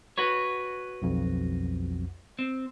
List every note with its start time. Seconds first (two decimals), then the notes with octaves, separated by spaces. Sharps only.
0.18 F#4 B4 C#5
1.02 B1 F2
2.39 C4